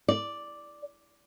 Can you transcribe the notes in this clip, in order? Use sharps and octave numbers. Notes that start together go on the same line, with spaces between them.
D5